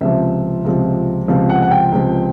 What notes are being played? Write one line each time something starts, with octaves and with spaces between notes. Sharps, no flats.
C#2 C3 F3 E5
C#2 C3 F3
C#2 C3 F3 F5
F#5
F#5
G5
C#2 C3 F3